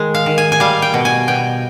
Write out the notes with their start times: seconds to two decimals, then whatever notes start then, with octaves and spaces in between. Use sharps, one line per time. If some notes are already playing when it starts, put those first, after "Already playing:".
Already playing: D#3 G#3
0.15 F5
0.26 D#3
0.38 G#5
0.52 G#5
0.60 G3 F5
0.82 G5
0.94 B2
1.05 G#5
1.28 B2 G5